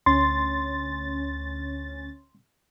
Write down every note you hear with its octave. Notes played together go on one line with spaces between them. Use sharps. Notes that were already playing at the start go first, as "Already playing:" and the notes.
D2 C#4 C6 A6